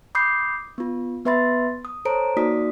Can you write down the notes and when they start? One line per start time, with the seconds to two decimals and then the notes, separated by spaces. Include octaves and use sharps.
0.15 B5 D6 D#6 G6 C7
0.78 B3 F4
1.25 B3 B4 E5 B5 C6 A6
1.85 D#6
2.05 A4 C5 C#5 A5 A#5 D7
2.36 A#3 D#4 F#4 D5 D#6 B6